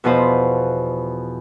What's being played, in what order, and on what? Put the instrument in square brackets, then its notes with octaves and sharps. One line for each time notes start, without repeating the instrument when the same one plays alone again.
[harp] E2 B2 F3 B4 C5